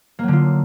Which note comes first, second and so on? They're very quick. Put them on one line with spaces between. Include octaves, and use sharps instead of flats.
A#3 F#3 D3 F4